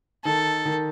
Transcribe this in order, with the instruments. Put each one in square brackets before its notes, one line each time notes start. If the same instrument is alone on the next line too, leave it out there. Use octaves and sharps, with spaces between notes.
[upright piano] D#3 [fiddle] A4
[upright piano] D#3